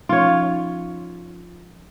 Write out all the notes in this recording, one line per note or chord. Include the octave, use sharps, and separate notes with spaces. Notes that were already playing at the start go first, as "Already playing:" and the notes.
F3 C#4 D#4 F4 C#5